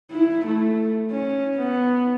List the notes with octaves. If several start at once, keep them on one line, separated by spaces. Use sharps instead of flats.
E4
A3
C#4
B3